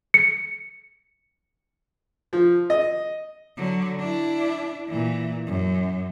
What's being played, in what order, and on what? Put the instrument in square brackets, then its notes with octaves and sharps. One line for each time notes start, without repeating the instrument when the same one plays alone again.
[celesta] C#7
[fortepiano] F3
D#5
[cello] D3 F#3
D4 E4
A#2 E3
F#2